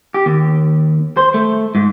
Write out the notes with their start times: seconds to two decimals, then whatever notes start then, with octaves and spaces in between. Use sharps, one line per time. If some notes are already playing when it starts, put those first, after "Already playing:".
0.14 G4
0.26 D#2
1.17 C5
1.34 A3
1.75 G#2